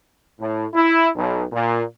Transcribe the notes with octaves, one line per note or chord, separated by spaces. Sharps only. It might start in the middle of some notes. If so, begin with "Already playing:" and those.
A2
E4
B1
A#2